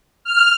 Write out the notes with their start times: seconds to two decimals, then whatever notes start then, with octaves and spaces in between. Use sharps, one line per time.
0.24 F6